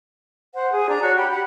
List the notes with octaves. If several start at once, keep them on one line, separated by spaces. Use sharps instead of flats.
C5 F#5
G#4
D4 A#5
F#4 C#5
G4 B5
F#5 B5